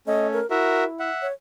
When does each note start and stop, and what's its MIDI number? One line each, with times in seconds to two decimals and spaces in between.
0.07 0.40 57
0.07 0.40 61
0.07 0.28 75
0.33 0.49 70
0.51 1.10 64
0.51 0.84 66
0.51 0.84 70
0.51 0.84 76
1.00 1.27 76
1.00 1.27 78
1.22 1.33 73